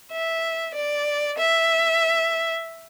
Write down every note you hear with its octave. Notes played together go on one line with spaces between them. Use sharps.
E5
D5
E5